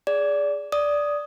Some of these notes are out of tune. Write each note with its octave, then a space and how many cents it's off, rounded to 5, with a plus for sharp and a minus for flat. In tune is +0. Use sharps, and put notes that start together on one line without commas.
G#4 +0 D5 -20
D5 -5 D#6 +0